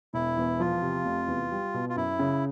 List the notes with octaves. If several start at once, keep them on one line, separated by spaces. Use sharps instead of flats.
E1 E4
E2
F3 F4
C3
F1
E2
G3
B2
F4
F#2 E4
C#3